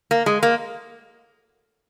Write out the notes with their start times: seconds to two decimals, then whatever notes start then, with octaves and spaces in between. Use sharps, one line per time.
0.11 A#3
0.26 G#3
0.43 A#3